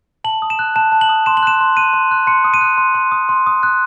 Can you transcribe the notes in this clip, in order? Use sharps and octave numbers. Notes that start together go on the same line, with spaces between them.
A5 F#7
D#6
E7
F#6
A5 E7
A5
F#7
D#6
C6 E7
F#7
F#6 E7
C6
F#6 D#7
C6
F#6
C6 C#7
D#6
D#7
F#6
C6
C6
D#6
C6
D#6
F#6